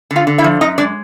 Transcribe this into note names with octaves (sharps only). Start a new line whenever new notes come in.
D3
F4 F5
D3
E4 E5
F3
F#2 D#4 D#5
G#3 D4 D5